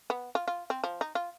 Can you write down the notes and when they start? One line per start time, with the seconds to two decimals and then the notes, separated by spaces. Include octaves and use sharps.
0.10 B3
0.35 F4
0.48 F4
0.70 C4
0.84 F3
1.01 D#4
1.15 F4